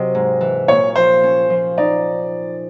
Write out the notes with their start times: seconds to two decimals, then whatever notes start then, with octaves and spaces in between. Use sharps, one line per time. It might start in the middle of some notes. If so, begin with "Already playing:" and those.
Already playing: C3 F#3 D#5
0.15 G#2
0.41 E3
0.68 A#2 C#5
0.96 F3 C5
1.24 C#4
1.50 F3
1.78 D#4 D5